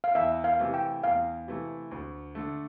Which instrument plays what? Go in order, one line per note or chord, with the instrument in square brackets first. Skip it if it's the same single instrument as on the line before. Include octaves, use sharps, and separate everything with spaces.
[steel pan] F5
[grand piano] E2 [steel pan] E5
[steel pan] F5
[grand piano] C3 E3 A3
[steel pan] G5
[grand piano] E2 [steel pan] F5
[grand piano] C3 E3 A3
D2
D3 A3